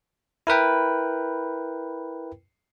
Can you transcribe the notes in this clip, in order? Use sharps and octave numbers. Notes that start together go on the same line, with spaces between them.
E4 A#4 B4 G5